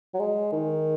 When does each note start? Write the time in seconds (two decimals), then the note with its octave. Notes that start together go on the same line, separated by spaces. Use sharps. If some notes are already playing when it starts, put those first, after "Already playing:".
0.14 F#3
0.19 G#3
0.53 D#3